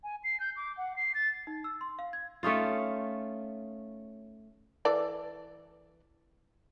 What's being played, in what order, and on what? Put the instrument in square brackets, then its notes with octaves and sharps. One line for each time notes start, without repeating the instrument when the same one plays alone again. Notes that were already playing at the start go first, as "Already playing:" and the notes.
[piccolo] G#5
C7
G6
D6
F#5
C7
A6
[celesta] D#4
E6
C6
F5
G#6
[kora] A3 C#4 D#4 F4
[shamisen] E3 A4 D5